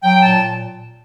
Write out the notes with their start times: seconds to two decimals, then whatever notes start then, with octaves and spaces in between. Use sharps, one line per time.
0.04 F#3 G5
0.22 A#2 A5